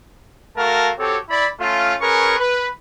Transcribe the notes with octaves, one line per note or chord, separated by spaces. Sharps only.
A3 F#4 A#4 F5 A5
C4 F#4 G4 A4 C#5
E4 D5 B5
A3 C#4 F4
C#4 G#4 A#4 B4 C#6
B4